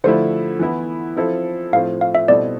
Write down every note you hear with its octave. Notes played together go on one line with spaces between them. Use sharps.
D3 F3 A3 E4 C5
E3 B3 E4
F3 C4 E4 A4
A2 F3 A3 C4 F5
F5
E5
B2 G3 C4 E4 A4 D5